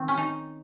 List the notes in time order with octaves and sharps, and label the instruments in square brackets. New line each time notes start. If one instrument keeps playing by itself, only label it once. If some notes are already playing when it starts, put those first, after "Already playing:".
Already playing: [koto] D#3 C4
C#4
D#4